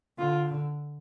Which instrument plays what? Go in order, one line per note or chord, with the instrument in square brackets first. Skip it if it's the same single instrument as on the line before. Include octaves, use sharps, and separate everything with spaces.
[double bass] D3 [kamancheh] F4